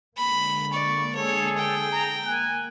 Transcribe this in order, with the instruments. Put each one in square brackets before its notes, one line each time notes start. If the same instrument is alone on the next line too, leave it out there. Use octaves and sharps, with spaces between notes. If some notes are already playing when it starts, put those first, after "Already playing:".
[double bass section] D3 G#3 A#3 [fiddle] B5
[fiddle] D5 [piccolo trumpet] C#6
[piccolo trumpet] G#4 [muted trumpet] A4 [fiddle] C#5
[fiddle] G5
[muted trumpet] A#5
[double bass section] A#3 [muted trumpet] G#5 [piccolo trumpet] F#6